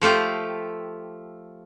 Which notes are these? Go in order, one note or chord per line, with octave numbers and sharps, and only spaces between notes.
F3 A3 F4 G4